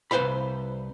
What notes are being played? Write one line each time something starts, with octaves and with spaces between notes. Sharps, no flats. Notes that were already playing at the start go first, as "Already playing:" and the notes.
C2 B4 C5 F5 B5